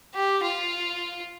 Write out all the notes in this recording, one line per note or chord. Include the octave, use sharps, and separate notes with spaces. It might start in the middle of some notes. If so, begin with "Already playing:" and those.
G4
F4